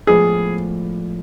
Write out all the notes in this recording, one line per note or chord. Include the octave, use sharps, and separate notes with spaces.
A2 F3 G#3 B3 D4 G#4